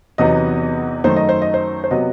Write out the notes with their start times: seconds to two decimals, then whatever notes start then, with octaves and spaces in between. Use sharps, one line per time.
0.18 E2 C3 F#3 B3 D#4 D#5
1.04 F#2 D#3 A3 D#4 C5
1.16 D#5
1.29 C5
1.42 D#5
1.54 C5
1.84 C5
1.91 C3 F#3 B3 D#5